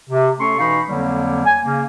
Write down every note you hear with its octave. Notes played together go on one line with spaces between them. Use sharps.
C3
A3 C#4 A4 C6 C#6
B2 E3 D#4 F5 B5 C#6
F2 D3 F#3 G3 A#3
G#5
C#3 A#3 C#4